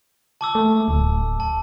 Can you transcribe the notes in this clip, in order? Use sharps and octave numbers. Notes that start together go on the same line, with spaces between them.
A5 D6 E6
A3
D1
A5